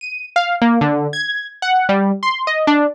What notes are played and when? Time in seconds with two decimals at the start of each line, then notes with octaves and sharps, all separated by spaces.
0.01 D#7
0.36 F5
0.62 A#3
0.81 D3
1.13 G#6
1.62 F#5
1.89 G3
2.23 C6
2.47 D#5
2.67 D4